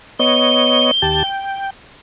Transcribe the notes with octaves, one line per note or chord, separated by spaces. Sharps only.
B3 C#5 D#5 G7
D#2 G4 A5
G5